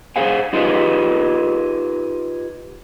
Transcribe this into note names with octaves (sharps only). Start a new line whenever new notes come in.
G#4 C5 F5 F#5 G#5
D#4 F4 G4 G#4 B4 D#5